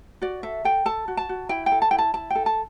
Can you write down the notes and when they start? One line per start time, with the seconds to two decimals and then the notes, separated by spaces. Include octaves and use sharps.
0.21 F#4 D5
0.43 A4 E5
0.64 A4 G5
0.85 A4 A5
1.08 F#4
1.17 A5
1.29 F#4
1.49 E4 G5
1.66 G5
1.72 A4
1.82 A5
1.91 E4 G5
1.98 A5
2.14 E4 A5
2.30 A4 G5
2.46 A5